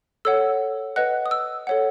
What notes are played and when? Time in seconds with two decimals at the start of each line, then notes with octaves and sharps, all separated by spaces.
0.25 A4 C#5 F#5 E6
0.96 B4 D#5 F#5 F#6
1.26 D#6
1.31 E6
1.67 A4 C#5 F#5